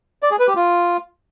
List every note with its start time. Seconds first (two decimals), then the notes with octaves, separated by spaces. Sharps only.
0.23 D5
0.31 G#4
0.39 B4
0.47 G4
0.56 F4